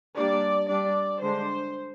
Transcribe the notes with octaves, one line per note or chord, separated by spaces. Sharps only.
G3 A#3 D4 D5
G3 D4 D5
D3 G#3 D4 C5